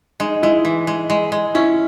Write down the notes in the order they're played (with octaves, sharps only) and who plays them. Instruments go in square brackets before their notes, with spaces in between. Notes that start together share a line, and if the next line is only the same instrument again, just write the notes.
[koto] G#3 [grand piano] D#4
[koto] G#3 [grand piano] E4
[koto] E3
G#3
G#3
G#3
[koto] C#4 [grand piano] E4